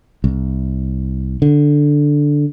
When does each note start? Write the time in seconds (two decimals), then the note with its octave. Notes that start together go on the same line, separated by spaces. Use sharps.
0.24 C2
1.42 D3